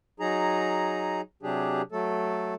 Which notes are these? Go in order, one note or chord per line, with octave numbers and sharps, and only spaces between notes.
F#3 D#4 G#4 A#5
C3 F#3 D4 G4 G#4
F#3 A3 A4